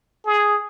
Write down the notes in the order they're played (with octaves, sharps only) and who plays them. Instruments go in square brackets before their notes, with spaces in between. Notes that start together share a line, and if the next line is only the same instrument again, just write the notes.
[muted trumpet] G#4